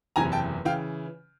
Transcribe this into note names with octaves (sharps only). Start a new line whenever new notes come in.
F#1 E2 C3 E3 G#5 A#5
G5 A5
C#3 E3 F5 G5